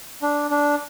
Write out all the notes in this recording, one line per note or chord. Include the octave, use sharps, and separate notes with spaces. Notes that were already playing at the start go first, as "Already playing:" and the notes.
D4
D4